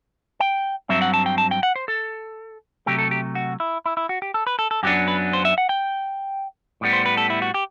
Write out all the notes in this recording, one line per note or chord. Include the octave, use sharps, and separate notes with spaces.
G5
G2 F#3 C4 E5
F#5
A5
G5
A5
G5
F#5
C5
A4
C3 F#3 A3 G4
A4
G4
F#4
E4
E4
E4
F#4
G4
A4
B4
A4
A4
F#2 F#3 B3 D4 G4
B4
C5
E5
F#5
G5
A2 G3 B3
C5
B4
A4
E4
F#4
G4